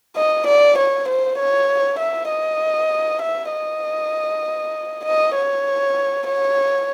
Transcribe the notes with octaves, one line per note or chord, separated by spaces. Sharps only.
D#5
D5
C#5
C5
C#5
E5
D#5
E5
D#5
D#5
C#5
C#5